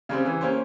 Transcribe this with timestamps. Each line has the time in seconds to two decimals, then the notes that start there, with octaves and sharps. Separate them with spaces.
0.09 C#3 G3 C4
0.25 E3
0.41 A#3 C#4 G4 C5